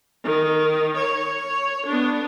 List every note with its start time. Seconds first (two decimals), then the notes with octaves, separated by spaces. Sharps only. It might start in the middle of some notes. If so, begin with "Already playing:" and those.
0.24 D#3
0.97 C#5
1.87 B3 D4